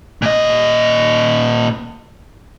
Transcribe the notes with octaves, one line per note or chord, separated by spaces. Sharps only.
A#2 D#5